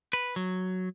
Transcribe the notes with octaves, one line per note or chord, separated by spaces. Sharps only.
B4
F#3